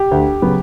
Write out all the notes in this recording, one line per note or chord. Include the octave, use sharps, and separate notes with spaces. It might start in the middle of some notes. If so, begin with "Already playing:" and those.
Already playing: G4
D2
C#3 F#3 B3